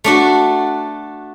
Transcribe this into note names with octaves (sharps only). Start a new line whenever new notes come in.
A3 D4 F#4